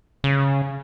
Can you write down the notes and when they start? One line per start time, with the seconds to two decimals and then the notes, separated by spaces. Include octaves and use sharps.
0.24 C#3